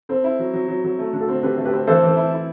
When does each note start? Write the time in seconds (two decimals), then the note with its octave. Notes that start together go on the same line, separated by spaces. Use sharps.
0.09 C4 A4 C5
0.24 E4
0.39 F#3
0.53 F#3
0.68 F#3
0.84 F#3
0.99 A3
1.13 D3
1.20 F#4 A4
1.29 C4
1.43 D3 G4 B4
1.58 A3
1.65 G4 B4
1.72 C4
1.87 E3 A4 C5
2.03 E3
2.17 E4
2.32 E4